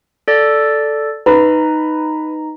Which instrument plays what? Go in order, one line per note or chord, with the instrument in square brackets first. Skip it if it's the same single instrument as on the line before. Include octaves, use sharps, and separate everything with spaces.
[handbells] A4 D5
[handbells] D#4 A#5 [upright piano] B4